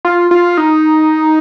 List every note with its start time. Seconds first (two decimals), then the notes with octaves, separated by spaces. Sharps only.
0.05 F4
0.31 F4
0.58 D#4